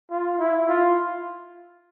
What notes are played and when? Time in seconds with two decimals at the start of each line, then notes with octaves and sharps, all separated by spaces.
0.10 F4
0.39 E4
0.69 F4